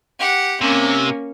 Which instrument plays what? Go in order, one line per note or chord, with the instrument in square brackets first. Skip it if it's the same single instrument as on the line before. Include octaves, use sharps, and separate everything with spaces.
[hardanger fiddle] G4 F#5
[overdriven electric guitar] C3 [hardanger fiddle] A#3 C#4